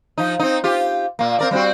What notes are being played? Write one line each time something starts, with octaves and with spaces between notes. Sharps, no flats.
F3 D#4
C4 D#4
F4 G4
A#2 A#3
C4 A#4 D5
G3 C4 F#4